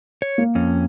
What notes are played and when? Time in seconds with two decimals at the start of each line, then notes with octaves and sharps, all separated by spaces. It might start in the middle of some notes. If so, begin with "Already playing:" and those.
0.22 C#5
0.38 A#3
0.55 F2 C#4